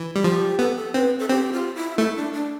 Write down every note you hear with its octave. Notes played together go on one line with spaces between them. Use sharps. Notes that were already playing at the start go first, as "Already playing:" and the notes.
Already playing: E3
G3
F3 G4
B3 A4
A4
C4 B4
A4
C4 G4
F4
E4
A3 E4
D4
D4